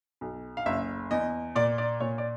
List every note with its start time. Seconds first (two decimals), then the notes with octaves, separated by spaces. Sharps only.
0.21 B1
0.57 F5
0.66 F#1 E5
1.11 E2 D#5
1.55 A#2 D5
1.78 D5
2.00 A#2 C#5
2.18 D5